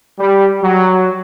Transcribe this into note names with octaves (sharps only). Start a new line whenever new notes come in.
G3
F#3